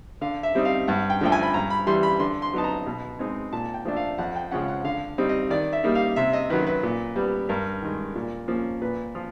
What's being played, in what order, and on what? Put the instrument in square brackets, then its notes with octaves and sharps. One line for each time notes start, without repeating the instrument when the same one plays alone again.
[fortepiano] D3 F5
E5
G3 C4 D#4
F5
G2 F#5
G5
D3 F3 A3 G5
G#5
B5
G2 A#5
B5
E3 G3 C6
B5
D3 C6
C6
F#3 B3 D#4 A5
A#5
B2
G#3 C4 D#4
A#2 A5
G5
F3 A3 D4
F5
F2 F#5
G5
C#3 F3 G#3 C#4 F#5
F#5
D3 F5
G3 C4 D#4
D#5
D#3 D5
E5
G3 A#3 D#4
F5
C3 E5
D#5
D#3 F#3 B4
B4
A#2
G3 B3
G2 A#4
D#3 G#3
A#2
F3 A#3 C#4
A#2 B4
F3 F4